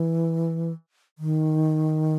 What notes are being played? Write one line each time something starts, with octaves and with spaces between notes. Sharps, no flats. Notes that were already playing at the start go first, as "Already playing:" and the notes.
Already playing: E3
D#3